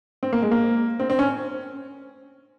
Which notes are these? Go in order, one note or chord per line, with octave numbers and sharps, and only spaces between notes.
C4
A#3
G#3
A#3
C4
C4
C#4